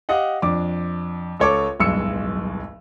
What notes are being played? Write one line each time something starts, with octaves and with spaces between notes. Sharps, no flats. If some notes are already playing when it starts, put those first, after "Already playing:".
G4 D#5 F5 F#5
F2 D4 D6
C#2 A4 C#5 D6
D1 B1 G2 G#3 E6 C#7